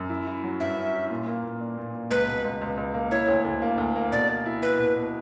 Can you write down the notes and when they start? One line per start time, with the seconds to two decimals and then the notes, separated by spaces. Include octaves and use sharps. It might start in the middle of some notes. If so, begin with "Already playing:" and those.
Already playing: F#2
0.10 E4
0.27 E4
0.44 F#3
0.60 G2 E5
0.77 C#4
0.94 E4
1.10 A#2
1.27 A#3
1.44 A#2
1.61 D4
1.78 A#2
1.95 A#2
2.10 C#2 B4
2.27 B2
2.45 C#2
2.61 C#2
2.77 C#2
2.94 A#3
3.11 E4 C#5
3.28 D2
3.45 D2
3.62 A#3
3.78 D2
3.96 A#3
4.12 B2 D5
4.28 A#3
4.46 E4
4.62 E4 B4
4.79 B2
4.96 B2